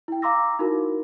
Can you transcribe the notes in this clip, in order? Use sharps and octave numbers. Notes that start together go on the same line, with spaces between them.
E4 G5
F5 A#5 C6 D6 E6 A#6
D#4 E4 F#4 A#4